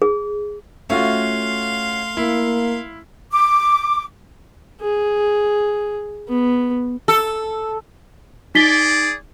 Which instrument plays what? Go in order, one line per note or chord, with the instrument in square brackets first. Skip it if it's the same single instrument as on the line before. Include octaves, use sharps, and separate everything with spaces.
[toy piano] G#4
[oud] A3 [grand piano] C#4 F4 F#4 [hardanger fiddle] F5 C6
[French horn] A#3 [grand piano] E4
[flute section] D6
[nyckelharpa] G#4
B3
[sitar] A4
[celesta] D#4 B6 G7 [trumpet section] G#4 D5